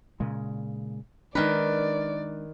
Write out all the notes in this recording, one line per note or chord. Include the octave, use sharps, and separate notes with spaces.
A#2 C#3 G#3
D#3 G#3 A3 D4 A#4 B4 D5